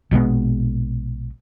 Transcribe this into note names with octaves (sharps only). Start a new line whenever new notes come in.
A#1 B2 G#3 B3